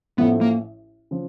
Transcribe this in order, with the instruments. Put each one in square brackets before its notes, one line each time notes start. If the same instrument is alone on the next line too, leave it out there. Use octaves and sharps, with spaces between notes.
[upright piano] A1 A2 F3 A3 [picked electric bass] B3
[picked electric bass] A#3
[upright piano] C#3 F3